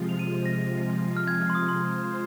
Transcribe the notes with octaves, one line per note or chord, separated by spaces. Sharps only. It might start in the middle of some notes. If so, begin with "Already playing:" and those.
Already playing: C3 F3 G#3 F4
F7
D#7
A#6
F6
G#6
F6
C6
D#6
C6
G#3 F4 C5